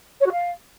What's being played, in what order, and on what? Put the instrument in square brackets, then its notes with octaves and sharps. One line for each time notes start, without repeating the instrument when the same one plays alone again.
[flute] C#5
F#4
F5